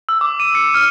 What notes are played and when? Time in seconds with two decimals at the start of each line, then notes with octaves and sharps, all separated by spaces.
0.09 E6
0.21 D6
0.40 D#7
0.55 C#7
0.74 F6